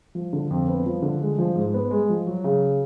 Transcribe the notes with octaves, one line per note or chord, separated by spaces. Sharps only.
F3
D3
F2
B3
F3
D3
G#3
F3
G#2
B3
G#3
F3
F#3
C#3